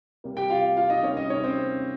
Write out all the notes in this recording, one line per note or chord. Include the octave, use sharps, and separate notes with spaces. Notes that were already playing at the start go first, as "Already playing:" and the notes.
C3 G3 A#3
G4 G5
F4 F5
F4 F5
D#4 D#5
C3 G3 A#3 C#4 C#5
D#4 D#5
C#4 C#5
C4 C5